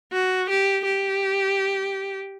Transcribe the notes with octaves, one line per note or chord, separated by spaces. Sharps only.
F#4
G4
G4